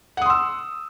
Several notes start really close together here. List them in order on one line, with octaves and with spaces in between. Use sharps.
F#5 D#6 C6 E6